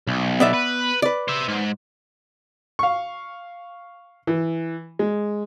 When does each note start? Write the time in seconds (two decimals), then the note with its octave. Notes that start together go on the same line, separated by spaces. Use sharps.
0.07 B1
0.40 B3 D5 E5
0.54 B4
1.02 B4 D5
1.28 C5 E5
1.48 G#2
2.79 F5 C#6
4.27 E3
4.99 G#3